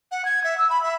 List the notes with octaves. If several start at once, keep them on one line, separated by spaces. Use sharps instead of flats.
F#5
G#6
E5
E6
B5
E5